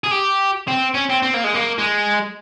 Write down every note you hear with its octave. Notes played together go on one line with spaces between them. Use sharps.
G#4
G4
C4
C#4
C4
C4
A#3
G#3
A#3
G#3